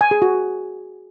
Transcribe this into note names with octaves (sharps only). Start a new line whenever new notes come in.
G#5
G#4
F#4